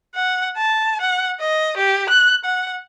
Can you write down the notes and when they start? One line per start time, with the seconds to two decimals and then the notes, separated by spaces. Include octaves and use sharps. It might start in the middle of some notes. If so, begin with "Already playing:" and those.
0.16 F#5
0.57 A5
1.02 F#5
1.40 D#5
1.78 G4
2.10 F#6
2.45 F#5